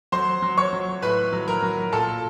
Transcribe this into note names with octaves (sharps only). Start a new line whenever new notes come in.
F#3 C5 C6
F#3
C#5 C#6
F#3
A2 B4 B5
F#3
A#4 A#5
F#3
A#2 A4 A5